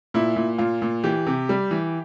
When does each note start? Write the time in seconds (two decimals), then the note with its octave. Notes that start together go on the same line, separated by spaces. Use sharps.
0.14 A#2 E4
0.36 A#2
0.58 A#2 F4
0.82 A#2
1.04 E3 G4
1.26 C3
1.49 G3
1.71 E3